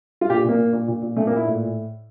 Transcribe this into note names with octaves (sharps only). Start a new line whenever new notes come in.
F4
A#2 G4
A#2 A#3
A#2
A#2
A#2
A#2
A#2 A3
A#3
A#2 E4
A2